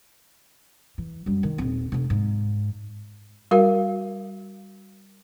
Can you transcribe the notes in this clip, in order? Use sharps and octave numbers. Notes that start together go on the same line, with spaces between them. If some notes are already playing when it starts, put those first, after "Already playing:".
E3
F#2 G3
D#3
D#1 C4
F1 C3
G#2
G3 F#4 A#4 F5